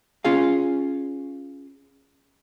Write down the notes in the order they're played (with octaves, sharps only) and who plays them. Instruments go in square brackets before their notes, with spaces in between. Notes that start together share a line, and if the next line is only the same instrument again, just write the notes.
[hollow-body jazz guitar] C#4 F4 G#4 F5